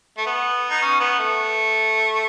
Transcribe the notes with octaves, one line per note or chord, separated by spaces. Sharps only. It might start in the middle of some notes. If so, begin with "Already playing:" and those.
A3
B3
D#4
C#4
B3
A3